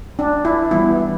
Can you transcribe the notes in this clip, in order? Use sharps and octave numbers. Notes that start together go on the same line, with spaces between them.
D4
E4
E3 G3 B3 E4